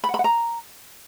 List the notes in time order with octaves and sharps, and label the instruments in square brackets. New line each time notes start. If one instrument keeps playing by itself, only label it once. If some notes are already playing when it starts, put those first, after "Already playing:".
[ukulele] B5
F#5
B5
F#5
A#5